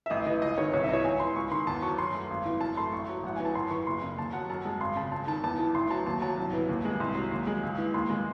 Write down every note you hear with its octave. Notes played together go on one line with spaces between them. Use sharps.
E5
A1 D#5
E3 D#5
C#2 D#5
D#3 C#5
C2 C#5
E5
E3 D#5
C#5
C#2 G#5
E3 C6
C#2 C#6
D#3 C6
E2 A5
F#3 C#6
F#2 C6
A3
G#1
E3
F#2 A5
A3 C6
A1 C#6
F#3
A1 F#5
E3 G#5
A5
F#2 C6
E3 C#6
F#1 C6
C#3
D#2 A5
F#3 F#5
F#2 A5
G#3
G#1 C6
C#3 A5
C#2 A5
D#3 A5
E2 A5
E3
A1 C6
F#3 A5
D#2 A5
F#3 A5
C2
E3
D#2
G#3
C2 C6
F#3
D#2
G#3
C#2
E3
D#2 C6
G#3